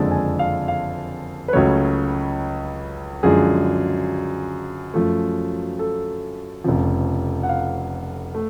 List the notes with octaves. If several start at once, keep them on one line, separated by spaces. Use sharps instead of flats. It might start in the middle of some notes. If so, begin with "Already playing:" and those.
Already playing: F#1 F2 D3 G#3 A5
G#5
F5
F5
B4
C#2 C#3 F#3 A3 C#5
F#2 D3 F3 G#3 G#4
F#2 F3 A3
A4
F1 F2 C#3 F3
F#5
F5
A3